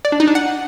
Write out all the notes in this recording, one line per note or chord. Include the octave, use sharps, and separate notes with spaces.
D5
D4
D#4
D4
F#5